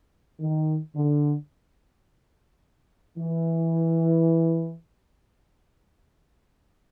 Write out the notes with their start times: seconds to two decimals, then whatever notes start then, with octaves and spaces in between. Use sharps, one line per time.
0.40 D#3
0.95 D3
3.18 E3